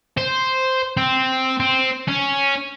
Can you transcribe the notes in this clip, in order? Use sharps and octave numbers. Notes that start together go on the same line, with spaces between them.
C5
C4
C4
C#4